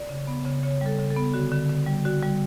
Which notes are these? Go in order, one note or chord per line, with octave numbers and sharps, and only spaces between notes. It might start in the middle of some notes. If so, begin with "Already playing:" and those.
Already playing: D5
C#3
B3
C#3
C#3 C#5
G3 A4
C#3
A4
B3
D3 F#4
D3
D3
G3
D3 F#4
G3